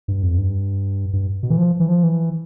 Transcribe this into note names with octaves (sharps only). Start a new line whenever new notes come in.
G2
F2
G2
G2
B2
E3
F3
E3
F3
E3